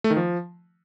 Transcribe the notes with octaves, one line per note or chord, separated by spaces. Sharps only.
A3
D#3
F3